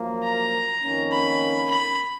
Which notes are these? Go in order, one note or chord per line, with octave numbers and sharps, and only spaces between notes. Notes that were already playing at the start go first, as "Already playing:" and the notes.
Already playing: F#2 F3 A#3
A#5
F2 D#3 A#3 C#4
B5
B5